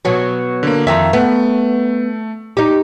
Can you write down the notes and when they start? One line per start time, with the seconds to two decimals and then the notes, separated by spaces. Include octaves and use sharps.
0.05 B2 F#3
0.63 D3 A#3
0.87 F2 D#3 F4 E5 A#5
1.13 A3 B3
2.57 D#4 G4 D6